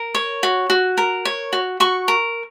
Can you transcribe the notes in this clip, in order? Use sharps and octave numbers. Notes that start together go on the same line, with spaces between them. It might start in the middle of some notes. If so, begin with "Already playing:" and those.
Already playing: A#4
C#5
F#4
F#4
A#4
C#5
F#4
F#4 C#6
A#4